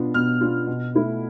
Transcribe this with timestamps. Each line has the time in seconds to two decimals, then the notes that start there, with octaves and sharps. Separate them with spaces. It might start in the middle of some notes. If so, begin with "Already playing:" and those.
Already playing: B2 B3 D4 F4
0.14 B2 F6
0.41 B3 D4 F4
0.67 B2
0.95 A3 E4